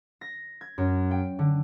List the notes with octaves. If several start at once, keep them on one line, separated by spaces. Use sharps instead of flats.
A#6
G#6
F#2
G5
D3